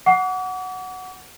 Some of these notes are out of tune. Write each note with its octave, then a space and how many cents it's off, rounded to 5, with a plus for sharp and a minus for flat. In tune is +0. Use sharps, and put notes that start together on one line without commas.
F#5 +0 D6 -45